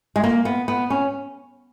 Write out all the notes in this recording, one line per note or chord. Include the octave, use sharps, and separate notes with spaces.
G#3
A#3
B3
B3
C#4